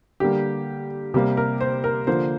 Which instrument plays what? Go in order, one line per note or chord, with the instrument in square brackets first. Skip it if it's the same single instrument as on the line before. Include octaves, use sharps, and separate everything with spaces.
[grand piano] D3 G3 A#3 G4
C3 G3 A#3 G4
A#4
C5
A#4
D3 F3 A#3 C5